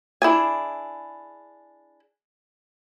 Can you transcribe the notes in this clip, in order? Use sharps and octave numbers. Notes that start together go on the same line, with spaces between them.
D4 E4 G#4 G#5